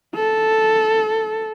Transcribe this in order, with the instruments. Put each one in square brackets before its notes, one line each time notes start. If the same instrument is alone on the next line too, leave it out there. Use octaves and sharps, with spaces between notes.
[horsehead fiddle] A4